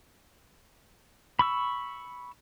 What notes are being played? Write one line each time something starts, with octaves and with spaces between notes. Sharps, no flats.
B5 C#6 E6